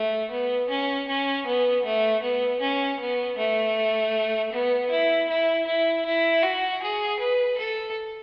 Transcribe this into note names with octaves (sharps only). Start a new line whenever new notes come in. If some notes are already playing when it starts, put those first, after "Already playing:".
Already playing: A3
B3
C#4
C#4
B3
A3
B3
C#4
B3
A3
B3
E4
E4
E4
E4
F#4
G#4
B4
A4